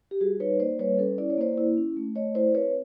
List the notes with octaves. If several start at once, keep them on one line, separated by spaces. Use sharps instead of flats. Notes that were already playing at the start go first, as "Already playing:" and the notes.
G4
G3 F#4 G#4
D#4 B4 C#5
A#3 C5 D5
G3 B4 C#5
C#4 A4 B4
E4 D5
C#5
A#3 C5 D5
E4
C#4
A3
A3 C#5 D#5
E4 C5 D5
C4 B4 C#5